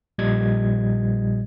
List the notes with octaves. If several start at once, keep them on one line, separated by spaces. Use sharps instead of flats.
A#1 A#2 G3 D#5 G#6